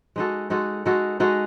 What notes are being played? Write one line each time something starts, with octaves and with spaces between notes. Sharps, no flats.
G#3 D#4 F#4 A4
G#3 D#4 F#4 A4
G#3 D#4 F#4 A4
G#3 D#4 F#4 A4